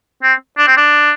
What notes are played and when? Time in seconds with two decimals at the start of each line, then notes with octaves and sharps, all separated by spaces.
0.23 C4
0.58 D4
0.67 C4
0.77 D4